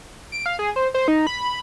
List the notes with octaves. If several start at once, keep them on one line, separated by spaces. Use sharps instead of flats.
D7
F5
G#4
C5
C5
D#4
B5